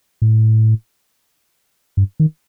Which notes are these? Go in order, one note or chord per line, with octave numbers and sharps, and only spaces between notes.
A2
G2
D#3